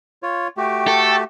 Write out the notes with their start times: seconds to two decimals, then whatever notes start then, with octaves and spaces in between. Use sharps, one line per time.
0.23 F4 C#5
0.57 A3 F#4 G4 G5
0.88 A4